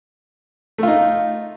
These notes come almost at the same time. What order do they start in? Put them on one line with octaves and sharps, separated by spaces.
A3 F4 D#4